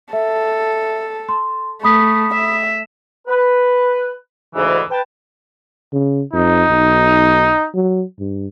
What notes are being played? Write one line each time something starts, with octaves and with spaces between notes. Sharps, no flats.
A4 E5
C6
A3 B5 D#6 B6
E5
B4
D2 G#2 C#3 E3
B4 G5 A5
C#3
F2 D#4
B1
F#3
G2